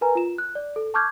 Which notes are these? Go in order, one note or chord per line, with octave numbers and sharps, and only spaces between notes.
A#4 B4 G#5 A#5
F4 E7
F#6
D5
A4
A5 C#6 D6 F6 G6 G#6